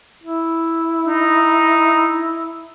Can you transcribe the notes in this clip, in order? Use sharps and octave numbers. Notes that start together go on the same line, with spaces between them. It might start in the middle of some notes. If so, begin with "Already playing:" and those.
E4
D#4